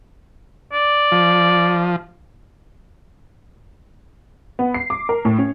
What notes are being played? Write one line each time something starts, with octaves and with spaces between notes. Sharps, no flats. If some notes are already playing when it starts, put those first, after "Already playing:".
D5
F3
B3
C7
D6
A#4
A2
C#4